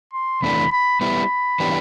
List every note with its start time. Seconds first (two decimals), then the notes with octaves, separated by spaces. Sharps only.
0.14 C6
0.42 E2 C3 E3 A3 D4 B5
0.72 B5
1.01 G3 B3 E4 B5
1.60 E3 B3 D4 G4